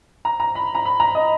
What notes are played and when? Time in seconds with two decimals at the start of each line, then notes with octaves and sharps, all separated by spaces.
0.25 A#5
0.40 A#5
0.55 B5
0.75 A#5
0.85 B5
1.00 A#5
1.15 D#5